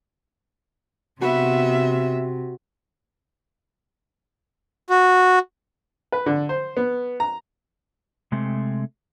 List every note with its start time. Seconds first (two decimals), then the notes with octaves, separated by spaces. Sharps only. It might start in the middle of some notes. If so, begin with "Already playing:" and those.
1.21 C3 B3 F#4 E5 B5
4.90 F#4
6.12 B4
6.26 D3
6.49 C5
6.77 B3
7.20 A#5
8.32 C3 G#3 A3 C4